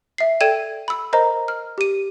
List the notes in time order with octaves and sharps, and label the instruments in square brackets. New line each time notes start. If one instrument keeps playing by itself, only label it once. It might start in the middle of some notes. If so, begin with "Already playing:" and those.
[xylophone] E5 C7
A4 D5 G5 G#6 D#7 E7
B5 E6
A#4 C5 D#5 A#5
F6
G4 D#7